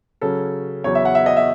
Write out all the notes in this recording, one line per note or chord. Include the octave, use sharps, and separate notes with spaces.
C#3 F#3 C#4 A4
E2 C#3 F#3 C#5
E5
F#5
E5
D#5
E5